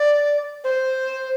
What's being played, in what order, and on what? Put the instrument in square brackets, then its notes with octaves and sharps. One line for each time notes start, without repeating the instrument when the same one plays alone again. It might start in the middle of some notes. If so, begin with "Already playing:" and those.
Already playing: [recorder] D5
C5